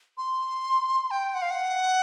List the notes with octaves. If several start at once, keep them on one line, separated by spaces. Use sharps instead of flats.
C6
G5
F#5
F5
F#5